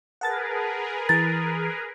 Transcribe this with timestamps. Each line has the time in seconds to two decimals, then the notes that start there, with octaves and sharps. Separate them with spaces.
0.21 G#4 A#4 B4 F#5 A5 A6
1.09 E3 A#5 A6